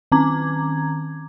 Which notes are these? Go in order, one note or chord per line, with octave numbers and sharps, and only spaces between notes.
D#3 C4 C#4 A#5 D6 G#6